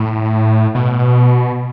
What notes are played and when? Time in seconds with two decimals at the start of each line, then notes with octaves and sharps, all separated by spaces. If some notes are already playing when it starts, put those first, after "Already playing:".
Already playing: A2
0.75 B2